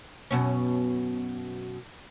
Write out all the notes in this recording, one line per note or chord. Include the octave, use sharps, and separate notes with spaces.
F#2 B2 C#4